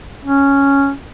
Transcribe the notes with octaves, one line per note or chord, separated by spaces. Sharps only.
C#4